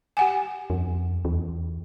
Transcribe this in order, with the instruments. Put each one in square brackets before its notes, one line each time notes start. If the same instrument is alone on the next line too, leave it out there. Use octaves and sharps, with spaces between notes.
[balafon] G4 F#5 G#5
[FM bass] F2
E2